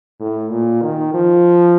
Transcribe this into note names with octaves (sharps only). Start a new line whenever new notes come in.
A2
A#2
D#3
F3